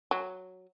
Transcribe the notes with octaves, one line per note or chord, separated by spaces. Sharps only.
F#3